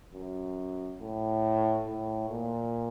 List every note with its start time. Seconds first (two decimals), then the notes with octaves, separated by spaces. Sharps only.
0.14 F#2
1.01 A2
1.87 A2
2.30 A#2